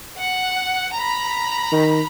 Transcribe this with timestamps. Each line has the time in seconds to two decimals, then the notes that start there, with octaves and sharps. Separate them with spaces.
0.18 F#5
0.94 A#5 B5
1.72 D#3